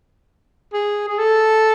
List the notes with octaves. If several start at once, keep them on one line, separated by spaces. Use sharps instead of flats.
G#4
G#4
A4